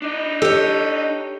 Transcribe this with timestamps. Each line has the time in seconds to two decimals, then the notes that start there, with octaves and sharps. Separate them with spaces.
0.02 D4 D#4
0.42 G4 A4 C#5